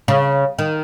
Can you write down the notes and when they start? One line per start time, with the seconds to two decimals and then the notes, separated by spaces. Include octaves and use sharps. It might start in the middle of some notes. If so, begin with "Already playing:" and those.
0.08 C#3
0.59 D#3